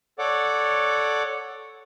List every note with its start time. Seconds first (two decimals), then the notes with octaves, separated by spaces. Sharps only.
0.19 A4 C#5 D5 F#5 D6